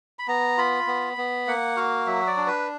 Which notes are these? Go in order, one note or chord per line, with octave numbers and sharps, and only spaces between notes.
B5
B3 A#5
F4 B5
B3
B3
A#3 F#5
F#4 F5
F#3 E5
D5
D4
B4